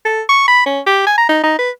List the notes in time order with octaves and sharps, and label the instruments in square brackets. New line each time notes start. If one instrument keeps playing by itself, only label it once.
[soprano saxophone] A4
C#6
B5
C#4
G4
G#5
A#5
D#4
D#4
B4